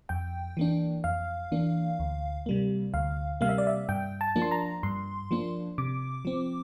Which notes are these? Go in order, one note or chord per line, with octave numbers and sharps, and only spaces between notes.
F2 G5
E3 A#3 D4
F2 F5
E3 A#3 D4
D2
C3 G3 A#3
D2 F5
C3 G3 A#3 F5
E5
D5
E5
G2 G5
A5
F3 A#3 D4
C6
A#5
G2 C6
F3 A#3 D4
C3 D6
F3 C4